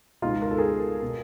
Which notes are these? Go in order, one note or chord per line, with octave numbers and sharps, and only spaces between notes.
C#2 B2 D#4 F4
A#4
A4
G#4 A#4
B2